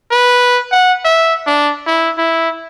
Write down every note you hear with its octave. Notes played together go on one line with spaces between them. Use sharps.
B4
F#5
E5
D4
E4
E4